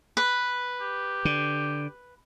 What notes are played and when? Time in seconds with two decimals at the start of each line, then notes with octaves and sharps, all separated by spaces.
0.17 B4
0.81 G4
1.25 D3